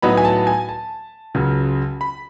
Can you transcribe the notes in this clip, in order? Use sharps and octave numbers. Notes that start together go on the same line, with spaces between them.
A2 F#3 B3 D#4 B5
G#5
A5
G#5
A5
C#2 C#3 F#3
B5